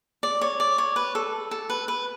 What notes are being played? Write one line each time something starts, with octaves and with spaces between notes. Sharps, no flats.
D5
C#5
D5
C#5
B4
A4
A4
B4
B4